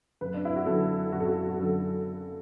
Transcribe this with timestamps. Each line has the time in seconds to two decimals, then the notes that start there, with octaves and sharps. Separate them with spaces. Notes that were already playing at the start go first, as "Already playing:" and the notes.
0.21 F#1 B4
0.34 D4
0.45 E4
0.56 F#4
0.66 F#2 D3 A4
1.12 F#1 F#4
1.20 A4
1.27 F#4
1.48 F#4
1.59 F#2 D3 A4